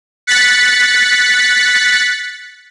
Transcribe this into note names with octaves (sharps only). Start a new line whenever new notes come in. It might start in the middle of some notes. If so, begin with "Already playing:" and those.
F#6 A6 B6 C#7